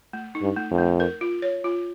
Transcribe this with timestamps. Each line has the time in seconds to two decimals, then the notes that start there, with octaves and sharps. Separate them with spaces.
0.13 A3
0.35 D#4
0.42 G2
0.56 A3
0.71 F2
0.78 A3
1.00 A#4
1.21 F4
1.42 C#5
1.64 F4